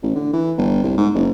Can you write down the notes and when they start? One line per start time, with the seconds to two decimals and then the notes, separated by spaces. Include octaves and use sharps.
0.03 A1
0.15 D3
0.33 E3
0.58 G1
0.84 C2
0.97 G#2
1.14 F#1